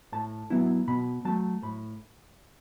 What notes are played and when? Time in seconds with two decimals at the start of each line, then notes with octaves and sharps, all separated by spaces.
0.12 A2 A5
0.50 F#3 B3 E4
0.88 B2 B5
1.25 F#3 A3 A5
1.63 A2 B5